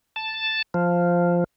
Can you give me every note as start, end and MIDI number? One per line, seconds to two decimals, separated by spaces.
0.16 0.62 81
0.74 1.44 53